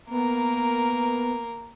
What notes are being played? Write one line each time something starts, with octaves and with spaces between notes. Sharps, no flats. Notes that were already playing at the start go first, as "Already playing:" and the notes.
A#3 B3 A#4